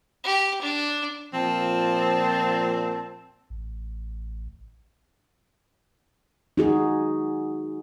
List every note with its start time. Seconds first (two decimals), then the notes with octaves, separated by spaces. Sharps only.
0.24 G4
0.61 D4
1.34 A#2 F3 C4 A5
3.50 A1
6.57 D#4 F#4 G#4